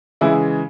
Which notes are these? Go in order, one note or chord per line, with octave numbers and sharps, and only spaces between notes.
C#3 E3 G#3 E4